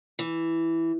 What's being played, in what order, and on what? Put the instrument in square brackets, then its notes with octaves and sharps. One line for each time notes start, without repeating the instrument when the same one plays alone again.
[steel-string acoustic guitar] E3